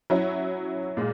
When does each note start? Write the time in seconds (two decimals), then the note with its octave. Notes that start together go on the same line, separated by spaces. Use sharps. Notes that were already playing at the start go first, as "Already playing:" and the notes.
0.10 F#3 C#4 E4
0.97 A#2 G#3